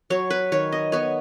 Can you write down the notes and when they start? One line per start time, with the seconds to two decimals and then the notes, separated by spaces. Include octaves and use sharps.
0.10 F#3 C#5
0.30 B4
0.52 D#3 C#5
0.72 D#5
0.92 B3 C#5